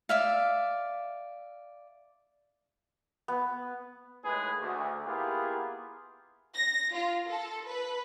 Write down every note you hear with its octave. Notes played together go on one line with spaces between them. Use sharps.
D5 E5 F5
B3
D#2 A2 G#3 G#4 B4
D2
A#3 B3 E4 F4 G4 G#4
A#6
F4
A4
B4